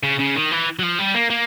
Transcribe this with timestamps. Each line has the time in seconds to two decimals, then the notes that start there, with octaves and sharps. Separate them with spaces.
0.04 C#3
0.20 C#3
0.36 D#3
0.51 E3
0.79 F#3
0.83 F3
0.99 G3
1.15 A#3
1.30 A#3